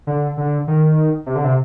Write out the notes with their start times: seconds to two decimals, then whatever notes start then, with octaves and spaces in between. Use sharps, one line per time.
0.07 D3
0.37 D3
0.68 D#3
1.26 C3
1.35 D3
1.44 C3